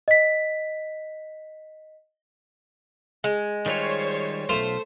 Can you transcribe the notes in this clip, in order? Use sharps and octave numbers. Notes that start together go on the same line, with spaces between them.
D#5 B6
G#3
D#3 G3 F4 C5 C#5
B1 A3 F4 C5